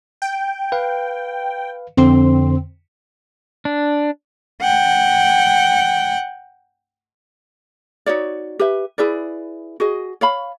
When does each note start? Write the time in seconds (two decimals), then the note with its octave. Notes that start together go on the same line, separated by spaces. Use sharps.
0.22 G5
0.72 B4 F5
1.97 F2 D3 C4 C6
3.65 D4
4.61 F#5 G5
8.06 D#4 F#4 C#5 D5
8.59 G4 B4 E5
8.98 E4 G#4 B4 D5
9.80 F#4 G#4 D#5
10.21 C#5 F5 B5